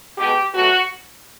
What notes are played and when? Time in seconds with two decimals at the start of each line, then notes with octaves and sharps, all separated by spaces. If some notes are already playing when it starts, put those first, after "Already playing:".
0.18 B2 G#3 G4
0.54 B2 F#3 A3 F#4